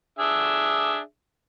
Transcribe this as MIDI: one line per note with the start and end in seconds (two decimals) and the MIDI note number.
0.19 0.99 62
0.19 0.99 68
0.19 0.99 76